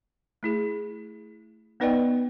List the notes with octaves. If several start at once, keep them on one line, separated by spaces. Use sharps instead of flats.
A3 E4 G#4
B3 D#4 B4 D5 D#5 G5